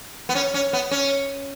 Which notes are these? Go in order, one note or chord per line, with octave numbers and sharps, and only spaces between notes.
B3
C#4
C#4
B3
C#4